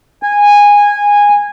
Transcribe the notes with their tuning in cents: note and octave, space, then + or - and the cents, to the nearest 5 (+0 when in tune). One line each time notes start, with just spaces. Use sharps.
G#5 -15